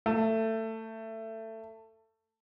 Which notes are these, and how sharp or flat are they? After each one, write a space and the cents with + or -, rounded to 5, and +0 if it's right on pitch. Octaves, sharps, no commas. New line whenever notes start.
A3 +20